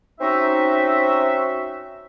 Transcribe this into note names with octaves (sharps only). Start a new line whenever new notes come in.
C4 C#4 D#4 F#4 E5